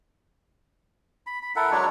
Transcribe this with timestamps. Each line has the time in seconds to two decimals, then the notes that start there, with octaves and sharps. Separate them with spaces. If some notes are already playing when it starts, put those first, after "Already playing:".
1.27 B5
1.43 B5
1.56 E4 A4 A#4 F#5
1.71 F#3 G#3 D4 C#5